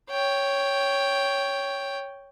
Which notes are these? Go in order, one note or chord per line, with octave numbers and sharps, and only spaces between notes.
C#5 G5